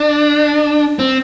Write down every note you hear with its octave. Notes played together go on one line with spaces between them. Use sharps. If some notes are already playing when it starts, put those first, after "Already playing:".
Already playing: D4
C4